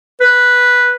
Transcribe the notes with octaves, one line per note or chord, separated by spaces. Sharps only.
B4